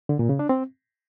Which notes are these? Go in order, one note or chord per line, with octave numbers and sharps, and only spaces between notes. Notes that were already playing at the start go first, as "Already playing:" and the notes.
D3
A#2
C#3
D4
C4